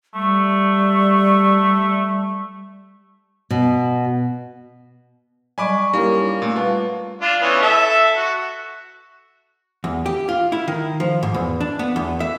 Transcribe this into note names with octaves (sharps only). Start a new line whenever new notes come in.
G3 A3
B2
F#3 G3 D5 D#5 G#5 B5 C#6 D6
G3 A#3 C#4 D#4 E4 A#4
A#2 A3
G3 F4 B4 F#5 A5 D6
D4 F4
E3 B3 C#4
A4 E5
F#4
E2
G4
F4
E4
D#3
F3
G#2
E2
D4
B3
E2
E5